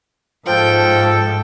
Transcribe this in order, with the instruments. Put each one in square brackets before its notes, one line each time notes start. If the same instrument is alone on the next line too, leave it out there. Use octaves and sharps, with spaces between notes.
[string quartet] G#2 [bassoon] F3 [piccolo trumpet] A4 [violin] G5